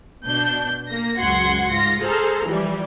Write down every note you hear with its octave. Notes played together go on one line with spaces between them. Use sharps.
B2 D4 G6
A#3 A#6
C#2 F#2 F#4 F#5 C6 G#6
G#2 F4 A#6
G#4 A4 C5 A#5 F6
E3 F3 G3